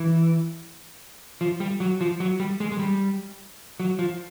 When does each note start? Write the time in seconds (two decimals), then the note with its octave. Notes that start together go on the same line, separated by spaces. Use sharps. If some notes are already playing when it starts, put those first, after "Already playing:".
Already playing: E3
1.41 F3
1.60 G3
1.80 F#3
2.01 F3
2.20 F#3
2.40 G3
2.60 G#3
2.72 G#3
2.79 G3
3.80 F#3
3.99 F3